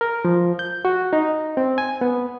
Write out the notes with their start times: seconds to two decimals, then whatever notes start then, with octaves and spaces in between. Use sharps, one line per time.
0.01 A#4
0.25 F3
0.59 G6
0.85 F#4
1.13 D#4
1.57 C4
1.78 G#5
2.01 B3